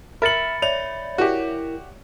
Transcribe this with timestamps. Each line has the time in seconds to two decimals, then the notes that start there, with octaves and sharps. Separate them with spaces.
0.22 A#4 E5 B5 A6 C#7 F#7
0.62 C#5 D5 E5 F7
1.18 E4 F#4 G4 A#4